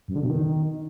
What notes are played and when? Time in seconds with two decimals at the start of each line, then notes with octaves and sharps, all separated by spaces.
0.08 F#2
0.15 D3
0.23 B2
0.30 D#3